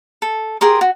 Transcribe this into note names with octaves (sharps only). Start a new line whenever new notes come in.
A4
G4 G#4 A#4 C6
F#4